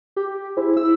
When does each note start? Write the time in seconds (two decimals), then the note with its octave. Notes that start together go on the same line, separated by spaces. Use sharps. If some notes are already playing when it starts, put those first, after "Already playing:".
0.16 G4
0.57 E4 G#4 C5
0.77 E4 E6